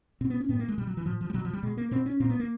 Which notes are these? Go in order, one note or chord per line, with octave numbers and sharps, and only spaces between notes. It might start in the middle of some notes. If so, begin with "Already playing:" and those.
B2 C4
B3
C#4
A2 B3
A#3
G#3
B2 G3
F#3
E3
A2 F3
F3
G3
B2 F#3
F3
G3
B2 G#3
A#3
B2 C4
C#4
A#2 C4
B3
A#3